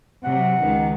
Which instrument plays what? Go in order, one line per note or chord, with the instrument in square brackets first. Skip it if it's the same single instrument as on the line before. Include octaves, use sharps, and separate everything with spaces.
[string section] C3 F#3 [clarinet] F#5
[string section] C#2 D#3